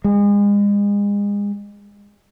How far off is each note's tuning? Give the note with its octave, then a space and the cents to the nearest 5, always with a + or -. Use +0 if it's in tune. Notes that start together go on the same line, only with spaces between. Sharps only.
G#3 -35